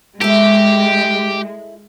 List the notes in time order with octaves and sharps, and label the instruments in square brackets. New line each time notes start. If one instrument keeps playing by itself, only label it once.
[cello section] G#3 [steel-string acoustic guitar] E4 A4 [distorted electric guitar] G4